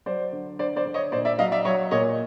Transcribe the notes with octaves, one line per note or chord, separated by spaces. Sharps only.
F#3 C5 D5
D3
D3 C5 D5
C5 D5
D3
C#5 D#5
A#2 C5 D5
D5 E5
F#3 D#5 F5
D5 E5
F#3 C#5 D#5
A#2 C#5 D#5